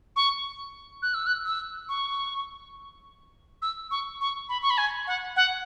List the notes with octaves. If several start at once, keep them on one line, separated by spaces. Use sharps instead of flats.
C#6
F#6
E6
F#6
E6
C#6
E6
C#6
C#6
B5
C#6
B5
G#5
F#5
F#5